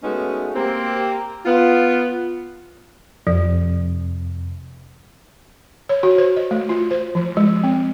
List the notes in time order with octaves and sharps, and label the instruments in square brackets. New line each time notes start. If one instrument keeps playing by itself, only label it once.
[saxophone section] G#3 A3 B3 C#4 D#4 F#4
A#3 C4 G4
B3 F4
[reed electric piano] F2 C3 [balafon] F3
[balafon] C#5
F#4
C5
D#5
A3
F4
C5
F3
G#3
C4